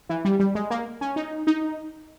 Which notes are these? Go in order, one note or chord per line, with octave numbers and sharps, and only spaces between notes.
E3
G3
G3
G#3
A#3
C#4
D#4
D#4